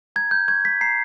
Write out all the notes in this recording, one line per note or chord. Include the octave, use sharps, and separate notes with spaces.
A#5 G#6
G6
C#6 G#6
B6
A#5 C7